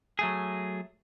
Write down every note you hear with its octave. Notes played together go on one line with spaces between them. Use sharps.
F#3 A3 G#4